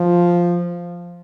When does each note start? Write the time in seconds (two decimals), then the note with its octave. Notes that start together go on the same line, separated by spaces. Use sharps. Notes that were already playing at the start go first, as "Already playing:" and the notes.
Already playing: F3